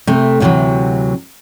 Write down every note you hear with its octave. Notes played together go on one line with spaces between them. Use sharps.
C3 A3
D2 A2 C3 D#3 E3 F#3